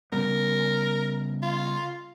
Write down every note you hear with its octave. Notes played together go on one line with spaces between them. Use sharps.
C#3 G3 B3 A#4
F4